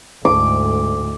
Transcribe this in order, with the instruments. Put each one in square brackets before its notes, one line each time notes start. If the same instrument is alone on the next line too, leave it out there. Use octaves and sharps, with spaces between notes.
[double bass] D2 G#2 [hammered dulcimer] D6